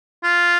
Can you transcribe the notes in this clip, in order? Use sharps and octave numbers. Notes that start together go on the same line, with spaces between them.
F4